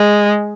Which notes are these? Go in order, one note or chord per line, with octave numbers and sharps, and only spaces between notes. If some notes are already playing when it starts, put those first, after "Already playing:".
Already playing: G#3